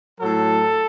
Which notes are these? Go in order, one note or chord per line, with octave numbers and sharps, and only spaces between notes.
A2 F#3 A4